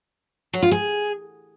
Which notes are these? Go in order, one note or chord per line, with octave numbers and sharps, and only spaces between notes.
F#3
F4
G#4